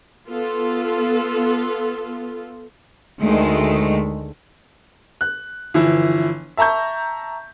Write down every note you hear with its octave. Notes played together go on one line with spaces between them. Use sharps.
B3 F4 A4
D2 D#3 G#3 A3
F#6
G1 E3 F3 E4
E5 A5 A#5 C#6 G6